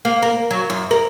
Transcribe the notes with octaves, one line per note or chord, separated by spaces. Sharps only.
A#3
A#4
F#3
F#2
A#4